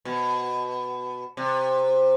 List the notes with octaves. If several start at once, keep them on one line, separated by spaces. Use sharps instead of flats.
B2
C3